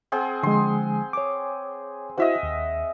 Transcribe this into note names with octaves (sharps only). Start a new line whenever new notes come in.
C4 G#4 F#5
D3 F3 G#3 C6
C#5 D6
E4 F#4 C5 D#5 E5 F#5
D#2